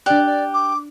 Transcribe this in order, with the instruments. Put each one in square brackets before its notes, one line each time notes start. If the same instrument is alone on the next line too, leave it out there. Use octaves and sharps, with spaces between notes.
[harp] D4 F#6 [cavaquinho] G4 [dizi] D5
[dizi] D5
D6